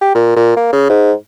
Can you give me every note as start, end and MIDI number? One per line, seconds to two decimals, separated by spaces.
0.01 0.10 67
0.15 0.34 46
0.36 0.55 46
0.57 0.70 58
0.73 0.85 49
0.90 1.12 44